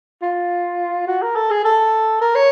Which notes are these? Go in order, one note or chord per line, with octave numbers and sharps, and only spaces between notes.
F4
F#4
A#4
A4
G#4
A4
A#4
C#5